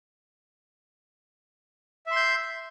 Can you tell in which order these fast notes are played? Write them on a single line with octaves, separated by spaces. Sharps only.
E5 C6 G6